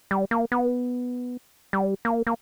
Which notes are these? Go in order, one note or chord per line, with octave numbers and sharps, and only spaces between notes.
G3
A#3
B3
G3
A#3
A#3